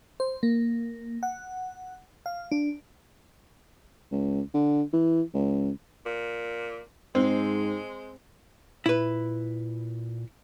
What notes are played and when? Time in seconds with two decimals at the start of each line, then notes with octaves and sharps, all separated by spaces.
0.20 C5
0.43 A#3
1.23 F#5
2.26 F5
2.51 D4
4.11 C#2
4.54 D3
4.93 E3
5.34 C#2
6.06 A#2
7.15 G#2 G#3 C4
8.86 A#2 E4 B4